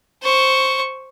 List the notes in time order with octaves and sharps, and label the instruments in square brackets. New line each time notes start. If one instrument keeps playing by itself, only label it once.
[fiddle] C5 C#6